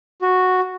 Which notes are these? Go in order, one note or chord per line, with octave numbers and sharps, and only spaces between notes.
F#4